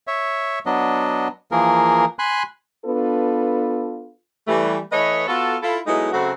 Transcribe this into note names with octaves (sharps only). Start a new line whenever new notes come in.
C#5 E5
F#3 B3 D4 D#5
E3 F3 A#3 G#4 A#4
G#5 B5 C6 F#6
B3 D4 F4 A4 B4
E3 G3 A3
E3 A3 B4 C#5 D#5
B3 F4 F#4 A4
E4 F4 A4
F#3 G#3 A3 B3 D#4 E4
C#3 F#3 A3 C4 F#4